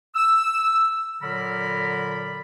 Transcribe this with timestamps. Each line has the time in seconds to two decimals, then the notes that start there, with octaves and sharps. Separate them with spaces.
0.15 E6
1.22 A#2 D3 F#3 A#4 D5 B5